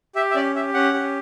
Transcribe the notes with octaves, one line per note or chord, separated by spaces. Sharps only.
G4 E5
E5
C#4 D5
G4 E5
C#4 F#5
G4